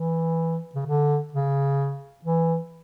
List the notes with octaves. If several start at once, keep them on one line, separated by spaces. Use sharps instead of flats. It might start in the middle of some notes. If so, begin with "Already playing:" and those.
Already playing: E3
C#3
D3
C#3
E3